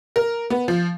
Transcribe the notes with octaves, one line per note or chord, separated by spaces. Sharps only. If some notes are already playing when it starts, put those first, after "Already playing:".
A#4
B3
F3